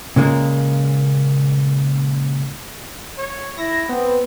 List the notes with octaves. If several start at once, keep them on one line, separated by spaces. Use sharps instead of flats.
A#2 C#3 G#3 A#3
C#5
E4 A#6
B3 C4